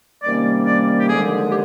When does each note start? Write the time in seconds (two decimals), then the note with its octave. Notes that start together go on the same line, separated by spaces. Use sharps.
0.23 C3 D#3 G3 A#3 C#4 D5
0.66 D5
0.99 G4
1.09 D#2 D3 F3 G#3 G#4
1.49 G4